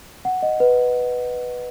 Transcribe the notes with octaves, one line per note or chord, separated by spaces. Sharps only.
F#5
D#5
B4